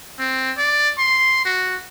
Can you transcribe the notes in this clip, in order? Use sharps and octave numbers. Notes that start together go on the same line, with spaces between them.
C4
D5
C6
F#4